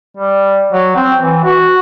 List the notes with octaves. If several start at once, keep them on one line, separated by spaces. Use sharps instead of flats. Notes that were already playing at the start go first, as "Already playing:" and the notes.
G3
F#3
C4
E3
F#4